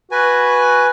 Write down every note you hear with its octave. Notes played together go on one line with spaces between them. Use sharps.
F#4 B4 G#5